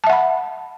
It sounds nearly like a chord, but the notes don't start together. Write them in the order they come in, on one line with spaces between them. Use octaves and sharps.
A5 E5 F#5 B5